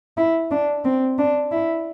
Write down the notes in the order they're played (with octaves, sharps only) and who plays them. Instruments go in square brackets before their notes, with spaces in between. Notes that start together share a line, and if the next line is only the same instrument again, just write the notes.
[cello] E4
D4
C4
D4
E4